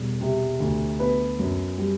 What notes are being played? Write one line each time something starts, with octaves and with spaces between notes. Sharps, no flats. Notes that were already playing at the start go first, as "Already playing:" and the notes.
Already playing: E1 G3
C3
D2
B3 B4
F#2
G3